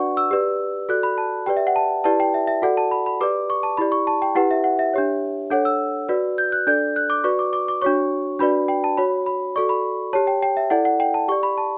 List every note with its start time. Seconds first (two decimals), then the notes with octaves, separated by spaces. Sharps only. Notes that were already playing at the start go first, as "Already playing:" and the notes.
Already playing: D4 F#4 B4 D5 F#5 C#6
0.17 E6
0.31 G4 B4 D5
0.89 F#4 A4 D5 F#6
1.03 B5
1.18 A5
1.46 G4 B4 D5 G5
1.57 E5
1.67 F#5
1.76 A5
2.04 E4 G4 B4 D5 A5
2.20 G5
2.34 E5
2.47 E5
2.62 F#4 A4 D5 F#5
2.77 A5
2.91 B5
3.06 B5
3.20 G4 B4 D5 D6
3.50 C#6
3.63 A5
3.77 E4 G4 D5 B5
3.92 C#6
4.07 A5
4.22 G5
4.35 E4 G4 B4 F#5
4.51 E5
4.64 F#5
4.79 E5
4.94 D4 G4 C#5
5.51 D4 A4 C#5 F#5
5.65 E6
6.09 F#4 B4 D5
6.38 G6
6.52 F#6
6.67 D4 A4 D5 G6
6.96 F#6
7.10 D6
7.24 F#4 B4 D5 C#6
7.39 D6
7.53 D6
7.68 D6
7.82 D4 F#4 C#5 C#6
8.39 D4 F#4 B4 D5 B5
8.68 G5
8.84 A5
8.97 F#4 C#5 B5
9.26 B5
9.56 F#4 A4 D5 C#6
9.69 B5
10.13 G4 C#5 A5
10.27 G5
10.43 G5
10.57 E5
10.70 E4 A4 D5 F#5
10.85 F#5
11.00 G5
11.14 A5
11.28 G4 D5 C#6
11.43 B5
11.58 A5